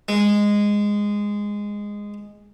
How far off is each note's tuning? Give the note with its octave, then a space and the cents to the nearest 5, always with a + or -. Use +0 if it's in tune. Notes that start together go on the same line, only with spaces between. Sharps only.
G#3 -10